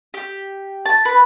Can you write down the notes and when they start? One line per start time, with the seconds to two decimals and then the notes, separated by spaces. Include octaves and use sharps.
0.14 G4
0.85 A5
1.05 B4